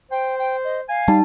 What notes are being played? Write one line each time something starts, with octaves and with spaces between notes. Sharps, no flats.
C5 G5
G5
D#5
F5 G#5
G3 D#4 A5